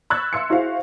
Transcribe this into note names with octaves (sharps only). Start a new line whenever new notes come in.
B5 C#6 E6 F#6 G#6 A6
E5 F5 C6 E6 G#6 C#7
E4 F#4 G#4 C5 F5